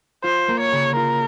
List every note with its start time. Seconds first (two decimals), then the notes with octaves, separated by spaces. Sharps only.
0.24 F4 C5
0.48 A#3
0.60 C#5
0.72 C#3
0.96 F4 A#4